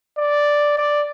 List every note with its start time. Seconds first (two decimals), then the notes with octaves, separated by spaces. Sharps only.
0.18 D5
0.78 D5